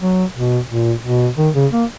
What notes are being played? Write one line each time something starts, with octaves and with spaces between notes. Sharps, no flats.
F#3
B2
A#2
B2
D#3
C#3
A#3